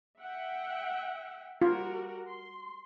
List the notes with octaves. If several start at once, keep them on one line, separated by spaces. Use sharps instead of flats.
E5 F#5 G5
G3 F4 F#4 A#4
C6